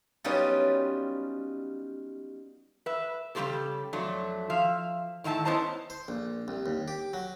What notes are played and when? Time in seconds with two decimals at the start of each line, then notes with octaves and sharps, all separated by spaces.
0.24 F#3 G3 B3 C#4 D#4 F4
2.86 B4 E5
3.35 C#3 G3 G#3 C4 G4 A4
3.93 F2 F#3 A3 D4
4.50 F3 E5 F5
5.24 A2 D#3 E5 G#5 A5
5.45 B3 C#4 E4 C5 D#5 A5
5.90 C5
6.08 A#1
6.48 C2
6.66 D#2
6.88 G4
7.13 F#3